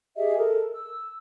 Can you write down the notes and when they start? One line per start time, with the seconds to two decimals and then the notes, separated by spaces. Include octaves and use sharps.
0.17 G4 G#4 D#5 E5
0.36 A4 A#4
0.73 E6